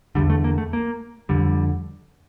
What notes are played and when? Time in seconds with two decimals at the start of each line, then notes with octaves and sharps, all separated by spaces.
0.15 E2 D3 G3
0.30 A3
0.44 A#3
0.58 A3
0.73 A#3
1.29 F2 D3 G3